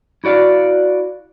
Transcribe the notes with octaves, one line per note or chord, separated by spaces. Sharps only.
E4 F#4 D5 F5